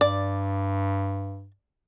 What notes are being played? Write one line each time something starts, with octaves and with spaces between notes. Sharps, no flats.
G2 D5